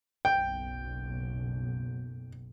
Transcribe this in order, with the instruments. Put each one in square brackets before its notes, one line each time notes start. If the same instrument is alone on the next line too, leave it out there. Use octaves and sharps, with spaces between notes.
[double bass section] F#1 B1 [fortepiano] G5